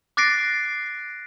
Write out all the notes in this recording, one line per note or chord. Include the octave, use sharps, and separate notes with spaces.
D6 F#6 A6 A#6 C7 D7